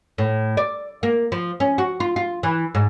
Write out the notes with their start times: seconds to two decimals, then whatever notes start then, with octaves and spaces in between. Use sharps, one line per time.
0.18 A2
0.57 D5
1.03 A#3
1.32 F3
1.60 C#4
1.78 F#4
2.00 F4
2.16 F4
2.43 E3
2.75 G#2